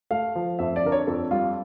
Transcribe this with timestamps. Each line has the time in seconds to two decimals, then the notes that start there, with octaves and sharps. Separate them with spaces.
0.11 A3 F5
0.35 F3
0.59 F2 E5
0.76 D5
0.83 D3 A#4
0.92 C#5
1.07 F2 A4
1.31 G3 F4